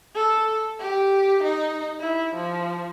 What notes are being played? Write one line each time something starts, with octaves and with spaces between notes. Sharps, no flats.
A4
G4
D#4
E4
F3